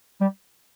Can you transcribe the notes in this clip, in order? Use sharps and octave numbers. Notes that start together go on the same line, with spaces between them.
G3